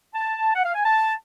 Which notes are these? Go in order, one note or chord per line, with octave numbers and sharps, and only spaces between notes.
A5
F#5
F5
G#5
A5